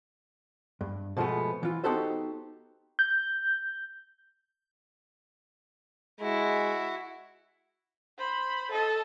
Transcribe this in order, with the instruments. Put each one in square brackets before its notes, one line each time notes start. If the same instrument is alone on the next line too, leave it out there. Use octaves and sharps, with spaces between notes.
[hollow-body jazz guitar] G2
B2 F3 G#3 A3 B3
E3 F4
B3 D#4 F#4 G4 A4 C5
[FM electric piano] G6
[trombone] G#3 [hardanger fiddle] E4 F#4
[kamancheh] C5 B5
A4 D#5